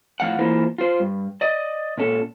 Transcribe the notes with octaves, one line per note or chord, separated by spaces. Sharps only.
A2 F3 F5 F#5
E3 A#3 E4 F4 A#4 C5
F4 C5
G2
D5 D#5
A#2 C#4 A4